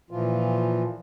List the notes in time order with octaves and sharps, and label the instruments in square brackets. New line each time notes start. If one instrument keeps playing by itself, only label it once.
[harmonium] A#2 E3 F3 F4